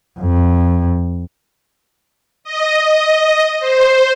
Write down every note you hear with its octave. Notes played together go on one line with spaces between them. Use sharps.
F2
D#5
C5